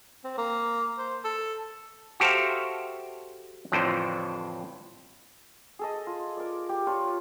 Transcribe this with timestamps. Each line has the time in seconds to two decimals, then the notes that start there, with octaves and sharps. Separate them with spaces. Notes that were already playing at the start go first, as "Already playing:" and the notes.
0.24 C4
0.38 A#3
0.98 C5
1.24 A4
2.20 F#4 G4 A4 C5 E5 F5
3.72 A1 F2 A2 D3 C5
5.79 G#4 A4 D#5
6.07 F4
6.37 A#4 D5
6.69 G4
6.86 D4 F4 C#5